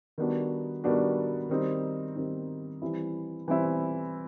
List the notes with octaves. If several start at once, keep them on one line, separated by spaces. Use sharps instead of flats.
D#3 G3 B3 D4 F#4
D#3 G3 B3 D4 F#4
D#3 G3 C4 D#4
D#3 G3 C4 D#4
E3 G3 C4 E4
E3 G3 C4 E4